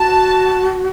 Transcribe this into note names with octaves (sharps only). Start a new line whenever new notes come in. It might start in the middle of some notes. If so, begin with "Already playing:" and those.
Already playing: F#4 A5